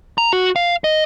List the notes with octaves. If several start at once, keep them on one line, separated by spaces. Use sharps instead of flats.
A#5
F#4
F5
D#5